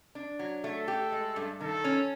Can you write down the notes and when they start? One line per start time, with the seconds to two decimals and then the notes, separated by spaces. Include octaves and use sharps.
0.15 D4
0.39 F#3
0.63 A3 A4
0.88 G4
1.12 G#3
1.36 G2
1.60 D#3 A4
1.84 C#4